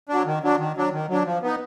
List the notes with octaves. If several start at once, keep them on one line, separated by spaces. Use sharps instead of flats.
F#3 D4
D#3
F#3 D4
D#3
F#3 D4
D#3
F#3 D4
F3
B3 D#4